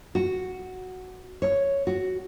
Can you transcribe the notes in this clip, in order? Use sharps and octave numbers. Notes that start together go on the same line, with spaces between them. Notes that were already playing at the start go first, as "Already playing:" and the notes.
F#4
C#5
F#4